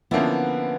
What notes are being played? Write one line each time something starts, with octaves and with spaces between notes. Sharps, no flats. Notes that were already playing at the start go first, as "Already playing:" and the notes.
D3 F3 A#3 B3 C#4 E4